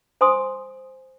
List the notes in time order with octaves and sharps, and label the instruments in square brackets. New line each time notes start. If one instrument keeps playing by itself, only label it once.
[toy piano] C5 G#5 C6 D#6